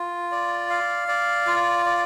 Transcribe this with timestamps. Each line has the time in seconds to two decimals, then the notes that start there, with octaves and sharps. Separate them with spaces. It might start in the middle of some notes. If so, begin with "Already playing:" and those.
Already playing: F4
0.32 D5
0.70 F5
1.08 D5
1.47 F4
1.86 D5